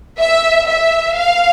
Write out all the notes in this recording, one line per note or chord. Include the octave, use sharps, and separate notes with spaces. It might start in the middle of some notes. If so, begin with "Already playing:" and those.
E5
E5
F5